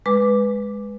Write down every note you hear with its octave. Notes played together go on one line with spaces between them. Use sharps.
G#3 B4 D6